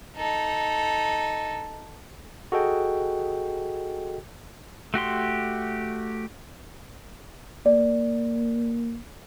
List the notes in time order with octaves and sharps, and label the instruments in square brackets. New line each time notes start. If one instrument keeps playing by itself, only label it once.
[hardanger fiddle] D#4 A4
[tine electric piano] F#4 G#4 A4 D#5 G5
[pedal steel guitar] A3 F#4 G4 C6
[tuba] A#3 [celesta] D5